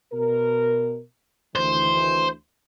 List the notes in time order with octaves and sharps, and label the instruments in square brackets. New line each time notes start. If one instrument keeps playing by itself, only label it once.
[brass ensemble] B2 A#4
[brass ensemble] D2 D#3 E3 [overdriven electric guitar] C5